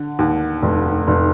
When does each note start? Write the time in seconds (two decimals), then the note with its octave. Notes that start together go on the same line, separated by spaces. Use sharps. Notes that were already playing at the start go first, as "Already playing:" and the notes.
Already playing: D3
0.19 D#2
0.62 F1
1.08 F1